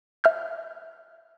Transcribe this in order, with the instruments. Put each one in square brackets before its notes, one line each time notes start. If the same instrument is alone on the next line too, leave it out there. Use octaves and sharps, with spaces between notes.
[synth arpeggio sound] E5 F6 G6